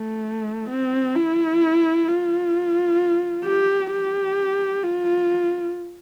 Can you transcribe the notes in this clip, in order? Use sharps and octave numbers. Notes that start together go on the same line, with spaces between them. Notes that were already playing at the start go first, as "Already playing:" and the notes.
Already playing: A3
C4
E4
F4
G4
G4
F4